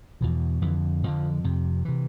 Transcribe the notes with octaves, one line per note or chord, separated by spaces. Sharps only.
E2 B2 F3
F2 D3 E3
F2 D3 F3
F2 C3
C3 E3